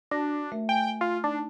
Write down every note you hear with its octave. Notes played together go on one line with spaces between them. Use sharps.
D4 F#4 A#6
A3 A#4 E5
G5 G#5
F4
D4 D#4 A5